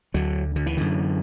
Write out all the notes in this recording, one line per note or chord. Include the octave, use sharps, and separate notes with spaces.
D2 D3 F#3
D3
E3
F#2 D3